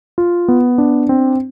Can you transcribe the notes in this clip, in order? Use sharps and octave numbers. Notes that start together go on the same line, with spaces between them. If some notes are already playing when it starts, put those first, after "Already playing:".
F4
B3
D4
C4